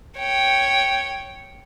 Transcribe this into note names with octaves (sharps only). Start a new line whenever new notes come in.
C#5 G5